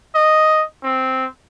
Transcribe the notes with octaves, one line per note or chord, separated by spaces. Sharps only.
D#5
C4